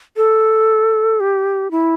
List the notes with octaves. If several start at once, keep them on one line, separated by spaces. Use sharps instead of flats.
A4
G4
E4